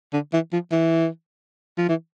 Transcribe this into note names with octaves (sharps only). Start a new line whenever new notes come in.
D3
E3
F3
E3
F3
E3